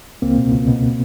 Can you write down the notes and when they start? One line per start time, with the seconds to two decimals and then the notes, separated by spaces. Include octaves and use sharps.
0.22 C#2 A#3 C4
0.38 B2
0.52 C#2
0.67 B2